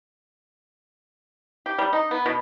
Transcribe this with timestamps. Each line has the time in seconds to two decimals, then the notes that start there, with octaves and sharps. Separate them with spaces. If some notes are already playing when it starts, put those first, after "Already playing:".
1.66 G4
1.78 G3
1.93 D#4
2.11 B3
2.26 B2